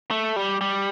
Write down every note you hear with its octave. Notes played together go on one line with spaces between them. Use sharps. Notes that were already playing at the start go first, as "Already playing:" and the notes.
A3
G3
G3